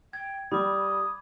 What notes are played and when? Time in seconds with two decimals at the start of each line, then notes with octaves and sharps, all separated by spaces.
0.13 G5 G#6
0.52 G3 B5 D6 D#6